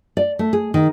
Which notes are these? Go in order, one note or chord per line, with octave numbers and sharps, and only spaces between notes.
D5
A3
G#4
D#3